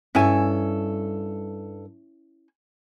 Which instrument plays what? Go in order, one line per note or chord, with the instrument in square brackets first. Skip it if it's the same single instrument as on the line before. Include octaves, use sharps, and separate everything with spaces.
[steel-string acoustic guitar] G2 A4 [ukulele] C#4 E4 G#5